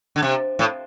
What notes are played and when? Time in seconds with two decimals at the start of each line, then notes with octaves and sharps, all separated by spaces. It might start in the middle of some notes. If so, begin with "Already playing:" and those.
0.16 D3
0.22 C3
0.59 A2